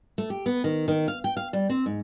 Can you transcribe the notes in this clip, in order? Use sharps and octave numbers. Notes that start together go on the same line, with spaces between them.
A3
G4
B3
D#3
D#3
F5
G5
F5
G3
C4
G#2